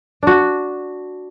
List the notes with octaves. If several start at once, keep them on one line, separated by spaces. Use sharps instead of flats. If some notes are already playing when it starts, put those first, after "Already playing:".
D4 F#4